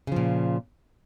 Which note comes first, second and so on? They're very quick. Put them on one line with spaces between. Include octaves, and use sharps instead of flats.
C#3 F3 A#2